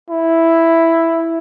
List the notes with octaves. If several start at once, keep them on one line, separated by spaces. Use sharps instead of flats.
E4